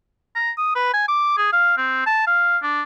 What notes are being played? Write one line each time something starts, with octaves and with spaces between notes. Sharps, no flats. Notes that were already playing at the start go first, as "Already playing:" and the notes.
A#5
D#6
B4
G#5
D6
G#4
F5
C4
A5
F5
D4